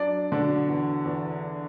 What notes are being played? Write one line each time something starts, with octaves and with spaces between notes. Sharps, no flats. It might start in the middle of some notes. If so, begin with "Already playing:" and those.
Already playing: F#3 D4 D5
B2 D3 D4
E2
E2